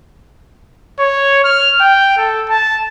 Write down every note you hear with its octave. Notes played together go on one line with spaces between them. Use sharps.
C#5
F6
G5
A4
A5